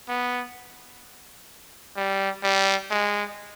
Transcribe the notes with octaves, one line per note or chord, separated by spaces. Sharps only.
B3
G3
G3
G#3